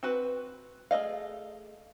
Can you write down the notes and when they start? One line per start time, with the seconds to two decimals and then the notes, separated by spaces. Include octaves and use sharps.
0.03 C4 F#4 B4
0.91 A3 G#4 D#5 F5